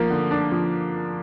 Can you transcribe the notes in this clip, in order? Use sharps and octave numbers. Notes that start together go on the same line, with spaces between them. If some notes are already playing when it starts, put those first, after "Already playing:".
Already playing: F3 A#3
D3
D4
F3